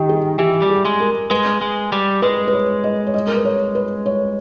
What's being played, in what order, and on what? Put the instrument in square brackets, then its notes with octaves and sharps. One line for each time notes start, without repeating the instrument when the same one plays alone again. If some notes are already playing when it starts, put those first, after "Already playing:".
Already playing: [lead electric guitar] D#3 [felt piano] G4
[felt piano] G#4
[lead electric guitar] E3 [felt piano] G4
[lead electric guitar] G3 [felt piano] G4
[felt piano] G#4
[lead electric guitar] G#3
[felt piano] A#4
[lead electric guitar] G#3 [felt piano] B4
[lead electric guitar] G#3
G3
[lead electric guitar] G#3 [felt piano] B4
[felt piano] B4
C#5
D#5
C#5
D#5
A#4
B4
C#5
B4
C#5